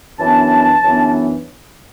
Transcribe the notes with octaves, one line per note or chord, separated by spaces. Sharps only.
F#2 E3 B3 D4 A5
F#2 E3 B3 D4